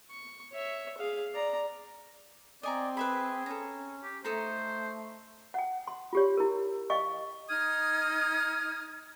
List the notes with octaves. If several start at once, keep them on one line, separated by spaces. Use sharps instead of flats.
C#6
C#5 E5
G#4 F5
D5 A#5
C4 D5 D#5 G#5 A#5
G#4 B4 E5 B5
C#4 A4 A#5
G4
A3 D#4 A4 C5 A#5
F#5 G5
C6
F4 G4 C#5
E4 A#4
D#5 F5 G5 C#6
D#4 D#6 F6 G#6